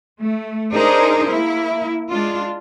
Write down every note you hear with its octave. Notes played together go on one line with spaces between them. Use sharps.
A3
D4 D#4 G#4 A#4 C5
A#3 E4
G#3 D4 F4